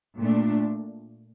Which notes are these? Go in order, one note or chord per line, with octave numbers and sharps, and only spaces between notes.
A#2 A3 D4